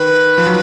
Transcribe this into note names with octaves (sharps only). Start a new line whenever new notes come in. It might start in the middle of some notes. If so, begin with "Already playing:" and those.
Already playing: D#3 B4
F3
F#3